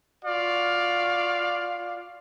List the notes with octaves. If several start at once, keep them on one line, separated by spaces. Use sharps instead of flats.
F4 F#4 D5 F5